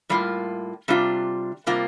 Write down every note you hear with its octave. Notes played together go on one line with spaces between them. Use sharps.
A2 G3 A#3 F4
C3 G3 D4 F4
C3 G3 A#3 F4